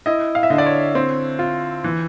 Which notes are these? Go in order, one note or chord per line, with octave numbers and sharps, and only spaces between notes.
E4 D#5
F5
E5
D3 D#5
D5
C#5
C4
F4
E3